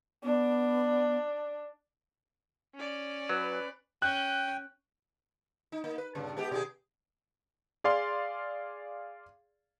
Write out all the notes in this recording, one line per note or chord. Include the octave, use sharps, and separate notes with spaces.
B3 D4
C#4 D5
F#3 B4
C#4 G5 F#6
D#4
A#3 D#4
B4
G2 A#2 C#3
G#3 B3 G4
B2 G4 G#4
G#4 D5 F5 C6